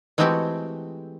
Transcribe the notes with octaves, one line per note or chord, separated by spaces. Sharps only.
E3 G#3 A3 C4 F#4 G4